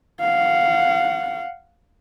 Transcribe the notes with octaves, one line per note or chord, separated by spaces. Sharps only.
F5 F#5